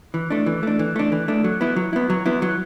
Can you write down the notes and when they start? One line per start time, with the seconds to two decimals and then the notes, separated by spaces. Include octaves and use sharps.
0.14 E3
0.30 A3 D4
0.46 E3
0.63 A3 D4
0.79 E3
0.96 A3 D4
1.12 E3
1.28 A3 D4
1.44 F#3
1.61 B3 E4
1.76 F#3
1.93 B3 E4
2.10 F#3
2.26 B3 E4
2.42 F#3